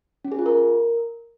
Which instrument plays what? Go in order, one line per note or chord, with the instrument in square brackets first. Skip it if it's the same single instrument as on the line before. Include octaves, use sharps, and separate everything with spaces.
[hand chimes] C#4
G#4
F4
A#4